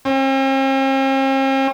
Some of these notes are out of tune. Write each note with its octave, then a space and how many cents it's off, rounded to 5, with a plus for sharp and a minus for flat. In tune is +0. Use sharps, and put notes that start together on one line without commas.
C4 +45